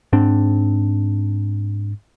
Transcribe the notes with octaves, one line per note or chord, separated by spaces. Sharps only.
G#2 C4 D4